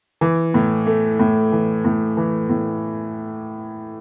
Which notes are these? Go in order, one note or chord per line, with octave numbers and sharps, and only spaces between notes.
E3
A2
A3
A2
E3
A2
E3
A2